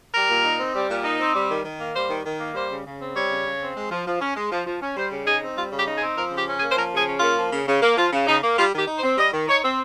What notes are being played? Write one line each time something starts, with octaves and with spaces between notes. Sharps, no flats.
G3 A#4
A#2
D#4
C4
G3
A#2
D#4
C4
G3
D#3
D#3
A#3
G3 C5
D#3
D#3
A#3
G3 C5
C#3
C#3
C4
G3 C#5
C#3
C#3
C4
G#3
F3
F3
C#4
G#3
F3
F3
C#4
G3 C5
C#3
D#4 G#4
C4
G3 F4
C#3
G4
D#4
G#4
C4
F3 A#4
C#3
G4
C#4
G#4
A#3
C5
F3 A#4
C#3 G#4
C#4
A#3 F4
F3
C#3
C#3
A#3
F3 F4
C#3
C#3 D#4
A#3
G3 F4
D#3
G4
D#4
C5
C4
G3 D#5
D#3
D#4 C#5
C4